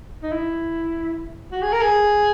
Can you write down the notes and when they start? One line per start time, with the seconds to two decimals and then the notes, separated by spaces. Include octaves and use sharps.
0.23 D#4
0.32 E4
1.52 F#4
1.63 G#4
1.73 A#4
1.82 G#4